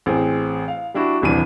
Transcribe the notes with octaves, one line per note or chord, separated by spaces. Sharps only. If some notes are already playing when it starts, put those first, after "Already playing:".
A1 C4 G#4
F5
G3 D4 E4 F#4
D#1 C2 C3 E3 D4 D#7